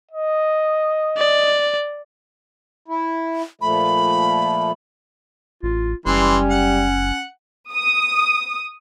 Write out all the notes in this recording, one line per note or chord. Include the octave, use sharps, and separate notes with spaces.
D#5
D5
E4
A#2 F3 A3 B5
A1 F4
F#1 E3 G3 C#4 C6
F#5
D#6